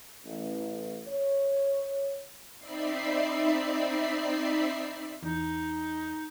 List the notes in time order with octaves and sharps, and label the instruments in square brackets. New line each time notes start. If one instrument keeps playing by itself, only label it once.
[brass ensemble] A1
C#5
[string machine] C4 D#4 D5 E5 B5 C7
[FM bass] E2 [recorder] D#4